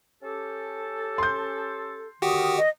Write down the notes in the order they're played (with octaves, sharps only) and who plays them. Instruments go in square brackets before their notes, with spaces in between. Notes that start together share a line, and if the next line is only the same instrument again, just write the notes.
[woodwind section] C#4 G4 A4
[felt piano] C6 G6
[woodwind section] D3 D#3 D#6 [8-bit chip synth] F#4 G4
[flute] D#5